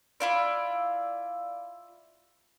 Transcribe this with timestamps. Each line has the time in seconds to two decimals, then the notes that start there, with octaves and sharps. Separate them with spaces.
0.20 E4 F4 D5